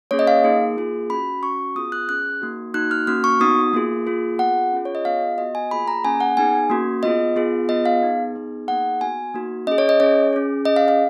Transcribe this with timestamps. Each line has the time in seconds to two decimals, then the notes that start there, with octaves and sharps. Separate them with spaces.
0.11 A#3 C#4 G#4 C#5
0.19 D#5
0.27 F5
0.44 A#3 D#4 G#4
0.77 A#3 F4 G#4
1.10 C#4 F#4 B5
1.43 C#4 F#4 C#6
1.75 B3 F4 G#4 D#6
1.92 F#6
2.09 C#4 G#4 F#6
2.41 A#3 D#4 F#4
2.74 A#3 D#4 F#4 F#6
2.91 F6
3.07 A#3 C#4 F#4 F6
3.24 C#6
3.40 B3 D#4 F#4 D#6
3.73 A#3 F4 G#4
4.07 A#3 F4 G#4
4.39 B3 F4 G#4 F#5
4.73 C#4 F4 G#4
4.85 C#5
4.95 D#5
5.05 B3 F4 G#4 F5
5.38 B3 F#4 D#5
5.55 G#5
5.71 A#3 F4 G#4 B5
5.88 A#5
6.04 A#3 C#4 G#4 G#5
6.20 F#5
6.37 B3 D#4 G#4 G#5
6.70 A#3 C#4 F#4
7.03 B3 F4 G#4 D#5
7.36 B3 F4 G#4
7.69 B3 F4 G#4 D#5
7.86 F5
8.02 B3 D#4 G#4
8.35 B3 D#4 G#4
8.68 A#3 D#4 G#4 F#5
9.01 B3 F#4 G#5
9.34 A#3 D#4 F#4
9.67 C#4 D#5
9.72 G#4
9.78 C#5
9.89 D#5
10.00 C#4 G#4 C#5
10.33 C#4 G#4
10.65 C#4 G#4 D#5
10.76 F5
10.88 F5